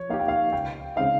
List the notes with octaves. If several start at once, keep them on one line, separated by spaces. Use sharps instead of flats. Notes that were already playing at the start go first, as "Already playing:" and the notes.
Already playing: F3 C#5
A#3 D#4 G4 F5
G5
F5
C#2 G5
C#3 G#3 C4 D#4 F5